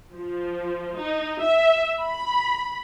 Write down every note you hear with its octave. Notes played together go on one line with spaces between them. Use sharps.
F3
D#4
E5
B5